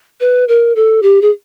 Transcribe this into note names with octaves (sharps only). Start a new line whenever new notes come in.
B4
A#4
A4
G4
G#4